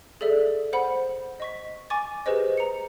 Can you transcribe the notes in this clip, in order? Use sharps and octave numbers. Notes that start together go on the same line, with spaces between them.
G#4 A4 D5 E5
C5 F#5 B5
D#5 C#6 B6
G#5 C#6 D6 A6
G4 G#4 B4 C5 D#5
A#5 C#7